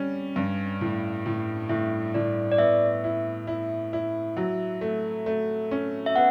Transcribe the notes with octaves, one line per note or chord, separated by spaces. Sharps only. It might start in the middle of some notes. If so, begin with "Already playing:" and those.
Already playing: G3 C#4
G2
A2
A2
A2 E5
A2 D5
D5
B3 E5
E4
E4
E4
F#3 E5
A3
A3
C#4
E5
B3 F#5